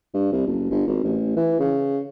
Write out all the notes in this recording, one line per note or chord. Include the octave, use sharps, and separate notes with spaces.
G2
C2
F#1
G1
G#1
A1
E3
C#3